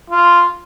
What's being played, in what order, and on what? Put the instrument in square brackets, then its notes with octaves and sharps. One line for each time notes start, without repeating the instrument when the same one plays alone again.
[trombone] F4